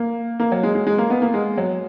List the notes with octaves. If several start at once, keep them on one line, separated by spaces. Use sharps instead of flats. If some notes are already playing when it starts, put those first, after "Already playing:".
Already playing: A#3
A#3
F#3
G#3
G#3
G#3
A#3
B3
A#3
G#3
F#3